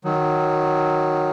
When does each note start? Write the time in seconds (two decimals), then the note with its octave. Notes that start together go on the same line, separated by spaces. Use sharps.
0.05 D#3 F#3